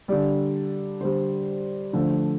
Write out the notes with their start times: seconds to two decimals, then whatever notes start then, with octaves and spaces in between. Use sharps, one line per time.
0.08 D3 G3 D5
1.01 D3 G3 C5
1.93 D3 F3 A3